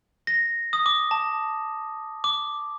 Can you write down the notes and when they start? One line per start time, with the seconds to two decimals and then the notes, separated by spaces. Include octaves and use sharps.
0.27 A#6
0.73 D#6
0.86 D6
1.11 A5
2.24 D6